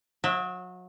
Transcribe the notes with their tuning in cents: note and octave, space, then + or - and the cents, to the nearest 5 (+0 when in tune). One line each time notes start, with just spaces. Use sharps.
F#3 -30 E5 +0